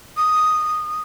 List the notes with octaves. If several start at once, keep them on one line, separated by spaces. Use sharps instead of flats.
D#6